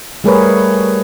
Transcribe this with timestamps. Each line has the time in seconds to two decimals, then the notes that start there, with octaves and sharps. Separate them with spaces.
0.24 G3 A3 G#4 A#4 B4 C#5